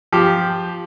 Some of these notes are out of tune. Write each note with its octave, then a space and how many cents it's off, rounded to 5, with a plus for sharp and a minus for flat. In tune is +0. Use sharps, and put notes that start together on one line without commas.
F3 +0 G4 +0